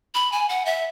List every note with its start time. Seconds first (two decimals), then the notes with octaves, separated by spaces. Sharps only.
0.15 B5
0.32 G#5
0.49 F#5
0.66 E5